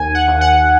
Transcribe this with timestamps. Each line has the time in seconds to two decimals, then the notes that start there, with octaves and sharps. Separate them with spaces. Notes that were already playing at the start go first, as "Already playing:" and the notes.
Already playing: D#2 G#5
0.14 F#5
0.28 D#2
0.41 F#5